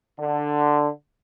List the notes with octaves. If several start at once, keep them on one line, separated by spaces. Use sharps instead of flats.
D3